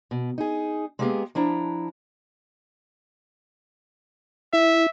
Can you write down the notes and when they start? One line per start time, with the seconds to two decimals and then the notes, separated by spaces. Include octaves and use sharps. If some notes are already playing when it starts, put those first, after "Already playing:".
0.11 B2
0.38 D#4 G#4
0.99 G#3 A#3 B3 D#4 G4 G#4
1.35 F3 D4 E4 A#5
4.53 E4 E5